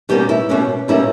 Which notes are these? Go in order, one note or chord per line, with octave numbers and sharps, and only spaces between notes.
B2 G3 A#3 C#4 G4
E4
B2 G3 A#3 C#4
B2 G3 A#3 C#4 E4